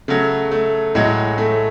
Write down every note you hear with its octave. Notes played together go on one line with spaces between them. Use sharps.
C#3 F#3 A3
A3
A2 F#3 G#3
A3